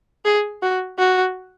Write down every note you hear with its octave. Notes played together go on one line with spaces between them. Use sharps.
G#4
F#4
F#4